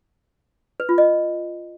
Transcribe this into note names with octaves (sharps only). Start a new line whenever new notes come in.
B4
F4
D#5